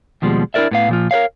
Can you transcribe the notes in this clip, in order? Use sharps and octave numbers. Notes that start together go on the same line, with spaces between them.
D#2 B2 F3 G3 G#3
D4 E4 G4 A#4 D5 E5
A2 B3 F5
A#2 F3 F4
A#4 B4 C#5 F5